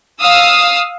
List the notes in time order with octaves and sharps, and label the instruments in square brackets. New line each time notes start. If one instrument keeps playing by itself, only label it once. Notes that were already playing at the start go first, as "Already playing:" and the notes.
[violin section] F5 D#6 E6